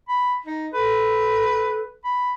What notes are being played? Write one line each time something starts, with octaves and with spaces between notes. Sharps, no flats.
B5
D#4
A4 B4
B5